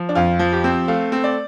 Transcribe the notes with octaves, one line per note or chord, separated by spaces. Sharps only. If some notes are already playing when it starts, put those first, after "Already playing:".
Already playing: F3
D4
F2 F4
F3
G4
C4
A3 F5
C4
D5